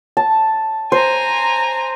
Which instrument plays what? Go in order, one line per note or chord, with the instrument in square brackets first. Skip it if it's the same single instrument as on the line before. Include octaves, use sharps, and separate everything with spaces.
[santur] A5
[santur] C5 [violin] G#5 A#5